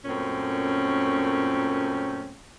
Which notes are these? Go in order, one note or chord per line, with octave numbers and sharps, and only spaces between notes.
F#2 A#2 A3 C4 C#4